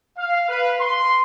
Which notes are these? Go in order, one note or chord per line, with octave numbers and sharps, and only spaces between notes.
F5
B4
C6